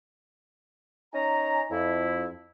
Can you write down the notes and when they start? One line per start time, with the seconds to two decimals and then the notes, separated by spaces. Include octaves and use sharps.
1.14 C#4 D#4 G#5 A#5
1.70 F2 E4